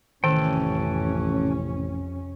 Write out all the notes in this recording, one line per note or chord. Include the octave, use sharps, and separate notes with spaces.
A1 F2 C3 D#3 E3 C#4 A4 G5